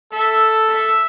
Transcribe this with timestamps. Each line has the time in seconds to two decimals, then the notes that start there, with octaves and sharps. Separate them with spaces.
0.13 A4 E5
0.70 E5